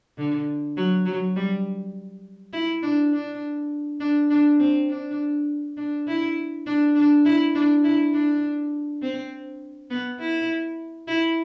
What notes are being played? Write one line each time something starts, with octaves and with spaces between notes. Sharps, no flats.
D3
F#3
F#3
G3
E4
D4
D4
D4
D4
C4
D4
D4
E4
D4
D4
E4
D4
E4
D4
C4
B3
E4
E4